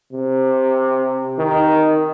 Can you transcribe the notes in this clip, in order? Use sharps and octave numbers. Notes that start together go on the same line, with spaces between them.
C3
D#3